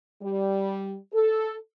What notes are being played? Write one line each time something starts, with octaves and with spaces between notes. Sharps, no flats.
G3
A4